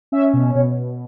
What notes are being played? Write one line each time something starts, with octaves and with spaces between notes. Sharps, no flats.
C#4 E5
B2
B2 C#5